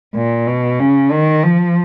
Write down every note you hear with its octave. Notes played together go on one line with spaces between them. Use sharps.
A#2
B2
C#3
D#3
F3